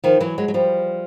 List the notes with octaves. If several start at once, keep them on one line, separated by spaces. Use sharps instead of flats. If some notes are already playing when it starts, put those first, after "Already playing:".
D#3 F3
E3 F#3
F#3 G#3
F#3
F3 G3